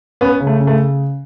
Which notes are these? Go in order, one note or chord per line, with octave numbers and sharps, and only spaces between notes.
B3 C#4
C#3
A3
C#3
A3